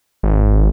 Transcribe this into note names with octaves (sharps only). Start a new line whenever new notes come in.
G#1